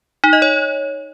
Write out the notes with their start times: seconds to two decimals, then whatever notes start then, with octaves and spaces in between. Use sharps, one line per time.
0.24 D#4
0.33 D#5
0.42 C#5